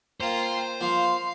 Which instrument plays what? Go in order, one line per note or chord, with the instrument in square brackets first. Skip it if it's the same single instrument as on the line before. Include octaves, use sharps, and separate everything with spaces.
[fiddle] A#3 F4 [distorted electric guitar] C5 [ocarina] G5
[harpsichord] F3 A#3 [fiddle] F5 [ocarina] C6